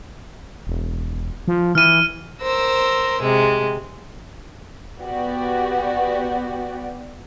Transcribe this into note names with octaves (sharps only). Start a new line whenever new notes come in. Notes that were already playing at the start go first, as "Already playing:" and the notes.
E1
F3
E3 F6 D#7
A#4 C5 E6
C3 G#3
B3 F#4 G4 D5